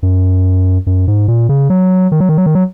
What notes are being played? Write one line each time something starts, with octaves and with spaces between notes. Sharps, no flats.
F#2
F#2
G#2
A#2
C#3
F#3
D#3
F#3
D#3
F#3
D#3
F#3